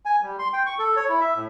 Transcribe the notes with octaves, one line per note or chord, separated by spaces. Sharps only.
G#5
G3
C6
G5
C#6
A4
C#5
E4
E5
A2